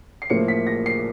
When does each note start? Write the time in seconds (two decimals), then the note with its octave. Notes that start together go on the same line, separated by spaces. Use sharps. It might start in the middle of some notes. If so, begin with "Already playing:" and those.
0.22 C7
0.30 A2 F3 A#3 C#7
0.48 B6
0.67 A#6
0.86 C7